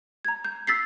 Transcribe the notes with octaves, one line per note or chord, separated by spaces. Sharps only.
A#5 G#6
G6
E6 A6 B6 C7